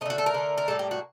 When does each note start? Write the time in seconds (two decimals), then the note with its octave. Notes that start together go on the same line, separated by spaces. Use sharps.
0.01 A3 D#4
0.06 D3 F#4
0.18 A4
0.26 A#4
0.34 D3 A3
0.58 A#4
0.68 A2 G3 A#3 A4
0.79 G4
0.91 F#4